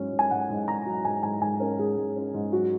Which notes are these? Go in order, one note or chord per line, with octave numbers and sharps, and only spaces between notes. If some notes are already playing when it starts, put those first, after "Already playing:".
Already playing: G#2 F#3 C#4
G#2
G#5
G#2 F#5
G#2
G#2 A#5
F#3
G#2 G#5
G#2 G#5
G#2 G#5
C#4 A#4
G#2 G#4
G#2
C#4
G#2
F#3 F#4